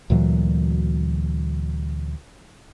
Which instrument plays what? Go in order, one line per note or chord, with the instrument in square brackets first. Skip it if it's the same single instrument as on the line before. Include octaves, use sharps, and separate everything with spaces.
[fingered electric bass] D2 A#2 E3 F#3